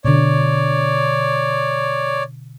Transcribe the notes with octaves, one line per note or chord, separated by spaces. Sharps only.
B2 D3 C#5 D5